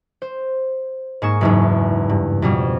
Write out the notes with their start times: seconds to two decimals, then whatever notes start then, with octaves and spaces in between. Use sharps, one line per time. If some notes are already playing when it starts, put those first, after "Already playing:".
0.22 C5
1.22 G#2 A#3 G#4 C#6 E7
1.41 F#1 E2 G#2
2.09 G2
2.42 F2 B2 G3